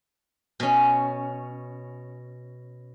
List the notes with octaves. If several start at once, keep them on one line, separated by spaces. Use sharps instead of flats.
B2 C#4